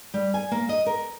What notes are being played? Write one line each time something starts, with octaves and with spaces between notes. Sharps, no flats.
G3
G#5
A#3
D#5
A#4